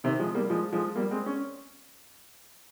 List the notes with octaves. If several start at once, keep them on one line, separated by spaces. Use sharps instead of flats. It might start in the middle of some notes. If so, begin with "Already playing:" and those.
C3 D#3
F3 G#3
G3 A#3
F3 G#3
F3 G#3
G3 A#3
G#3 C4
C#4